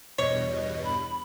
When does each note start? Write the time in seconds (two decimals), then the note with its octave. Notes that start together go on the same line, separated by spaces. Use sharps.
0.18 E2 G2 B2 C#5 D#5
0.84 B5